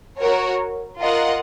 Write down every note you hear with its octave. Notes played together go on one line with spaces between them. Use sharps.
F#4 A#4 C#5
F4 A#4 D#5 F#5